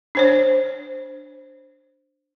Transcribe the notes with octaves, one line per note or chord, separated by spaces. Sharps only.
D4 C5 C#5